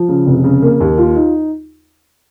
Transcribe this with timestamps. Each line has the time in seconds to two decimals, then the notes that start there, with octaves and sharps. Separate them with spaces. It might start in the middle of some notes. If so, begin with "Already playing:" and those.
Already playing: F3
0.09 C#3
0.27 F1
0.44 C#3
0.62 A#3
0.80 D#2
0.98 F4
1.16 D#4